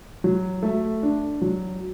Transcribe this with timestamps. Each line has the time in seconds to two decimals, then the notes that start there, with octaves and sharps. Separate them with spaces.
0.24 F#3
0.63 A3
1.03 D4
1.42 F#3